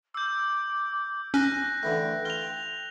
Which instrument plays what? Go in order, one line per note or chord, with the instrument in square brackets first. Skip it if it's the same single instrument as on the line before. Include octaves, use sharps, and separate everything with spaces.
[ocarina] D6 [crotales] E6 G6
[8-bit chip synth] C#4 [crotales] F#6 A#6
[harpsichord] D3 E3 A3 [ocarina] G5
[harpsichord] F4 [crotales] F7 G7